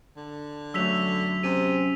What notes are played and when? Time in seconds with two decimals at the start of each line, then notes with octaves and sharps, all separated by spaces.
0.16 D3
0.74 F#2 F#3 A3 E6 B6 F7
1.43 C3 C#4 D#7